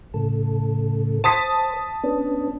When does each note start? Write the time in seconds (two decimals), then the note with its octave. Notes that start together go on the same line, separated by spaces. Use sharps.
0.14 A2 C#3 A4
1.24 C5 A5 D#6 B6
2.03 B3 C#4 D4